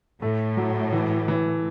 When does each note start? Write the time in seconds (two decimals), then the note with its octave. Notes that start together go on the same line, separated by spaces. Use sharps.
0.21 A2 A3
0.57 F#3
0.93 E3
1.28 E3